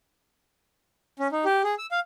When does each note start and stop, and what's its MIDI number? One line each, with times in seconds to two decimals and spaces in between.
1.19 1.28 61
1.32 1.45 63
1.45 1.62 67
1.64 1.75 68
1.78 1.86 88
1.91 2.00 77